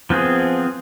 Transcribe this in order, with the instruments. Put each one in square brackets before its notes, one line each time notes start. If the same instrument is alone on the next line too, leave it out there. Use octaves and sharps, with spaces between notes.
[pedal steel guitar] F3 B3 C4 G#4